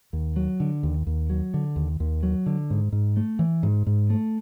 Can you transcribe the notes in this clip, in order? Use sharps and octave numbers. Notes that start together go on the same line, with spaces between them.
D#2
F#3
D3
D#2
D#2
F#3
D3
D#2
D#2
F#3
D3
G#2
G#2
A3
E3
G#2
G#2
A3